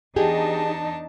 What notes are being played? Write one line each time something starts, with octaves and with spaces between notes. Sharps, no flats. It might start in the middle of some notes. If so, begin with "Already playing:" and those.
E2 D4 D#4 G4 G#4 A5